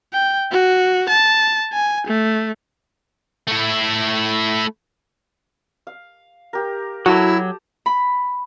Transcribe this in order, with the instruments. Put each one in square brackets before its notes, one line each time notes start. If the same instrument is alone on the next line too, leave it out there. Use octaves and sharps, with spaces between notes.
[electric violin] G5
F#4
A5
G#5
A3
[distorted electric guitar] A3 E4
[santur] F5
G4 A#4
[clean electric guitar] F#3 [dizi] E4 [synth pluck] F#4 [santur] G4 A4 D#6
[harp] B5